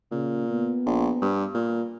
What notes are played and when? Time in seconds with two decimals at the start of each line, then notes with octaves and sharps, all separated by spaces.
0.12 A#2 C#3
0.48 B3
0.86 A#1
1.22 G2
1.54 A#2